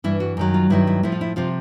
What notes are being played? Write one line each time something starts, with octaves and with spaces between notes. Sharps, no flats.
G2 E3 E4
F#4
F#2 D#3 F#3
F4
G2 D#3 F#3 E4
E4
A2 F3 E4
F4
E4
C3 F3 F4